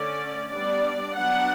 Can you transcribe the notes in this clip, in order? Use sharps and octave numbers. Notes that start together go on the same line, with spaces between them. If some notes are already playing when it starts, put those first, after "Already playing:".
Already playing: D3 A3 C#4 D5
G3 B3 D4 D5
F#3 B3 D4 F#5